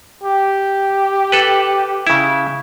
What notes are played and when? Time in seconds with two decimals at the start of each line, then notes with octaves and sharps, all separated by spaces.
0.24 G4
1.32 A4 B4
2.07 C#3 E4